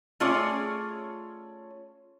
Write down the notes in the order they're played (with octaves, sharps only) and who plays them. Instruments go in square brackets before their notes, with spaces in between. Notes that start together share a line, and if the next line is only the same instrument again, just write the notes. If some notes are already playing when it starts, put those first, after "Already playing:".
[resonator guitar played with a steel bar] A3 C#4 F4 G#4 C#5 D5